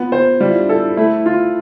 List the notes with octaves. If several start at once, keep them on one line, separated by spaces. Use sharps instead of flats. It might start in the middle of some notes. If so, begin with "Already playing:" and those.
Already playing: B3 F4
C5
G3 F4
E4
D4
E4 A4
A3 E4
F4